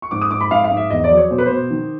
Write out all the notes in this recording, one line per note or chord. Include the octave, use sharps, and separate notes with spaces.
C#6
G#2 D6
D#6
G#2 D6
B5
G#2 F5
F5
G#2
E5
E2 D#5
D5
F#3
C#5
B2 C5
B4
B2 C5
D#3